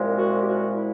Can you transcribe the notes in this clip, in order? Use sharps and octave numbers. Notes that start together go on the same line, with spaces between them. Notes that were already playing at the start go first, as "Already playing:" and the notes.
Already playing: C2 A#2 F3 G#3
F#4
G4
F#4
E4